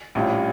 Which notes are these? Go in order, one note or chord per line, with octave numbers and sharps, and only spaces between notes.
A#1 A2 G3 C#4 F4